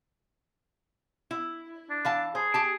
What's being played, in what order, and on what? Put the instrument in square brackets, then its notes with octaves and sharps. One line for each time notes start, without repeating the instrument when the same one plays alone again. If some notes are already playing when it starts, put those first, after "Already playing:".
[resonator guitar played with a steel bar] E4
[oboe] D4
[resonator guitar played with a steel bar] E3 F5 A5
[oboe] G#4 [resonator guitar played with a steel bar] C5
[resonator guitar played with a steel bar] G4 A5